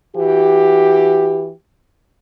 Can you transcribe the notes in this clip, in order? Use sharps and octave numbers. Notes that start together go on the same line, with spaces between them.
E3 F#4 G4